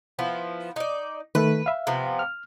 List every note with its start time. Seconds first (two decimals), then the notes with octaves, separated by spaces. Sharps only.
0.19 F3 B3 E4
0.76 D#4 D5
1.35 D#3 A3 A4 B4
1.66 E5 F5
1.87 C3 F3 B3
2.19 F6